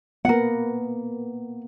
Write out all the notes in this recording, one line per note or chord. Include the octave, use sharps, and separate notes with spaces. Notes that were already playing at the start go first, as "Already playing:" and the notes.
A#3 B3 A#4 F#5